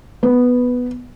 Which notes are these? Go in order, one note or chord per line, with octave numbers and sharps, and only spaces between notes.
B3